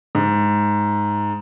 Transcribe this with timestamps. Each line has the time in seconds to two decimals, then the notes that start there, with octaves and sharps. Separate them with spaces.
0.15 G#2